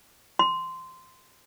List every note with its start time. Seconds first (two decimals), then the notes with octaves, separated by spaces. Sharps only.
0.39 C6